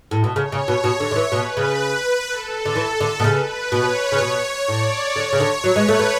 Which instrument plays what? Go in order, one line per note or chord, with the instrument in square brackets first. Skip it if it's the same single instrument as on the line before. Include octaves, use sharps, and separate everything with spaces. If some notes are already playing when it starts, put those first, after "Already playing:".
[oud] A2
B2
[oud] C#3 [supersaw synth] C#5
[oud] C#3
B2
B2
D3
D3
E3
[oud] B2 [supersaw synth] B4
[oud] C#3
[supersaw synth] A4
[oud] D3
[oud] E3 [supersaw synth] A4
[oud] D3
B2
[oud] C#3 [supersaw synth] B4
[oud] B2 [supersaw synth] C#5
[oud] C#3
B2
[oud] A2 [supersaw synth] D5
[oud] D3 [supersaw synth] C#5
[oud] C#3
D3
[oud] F#3 [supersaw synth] B4
[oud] G#3
A3
A3